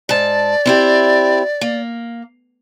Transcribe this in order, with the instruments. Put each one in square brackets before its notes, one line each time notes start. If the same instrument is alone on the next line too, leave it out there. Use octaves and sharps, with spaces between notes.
[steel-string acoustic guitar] G#2 A5 [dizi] D5
[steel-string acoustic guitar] C4 E4 G4
A#3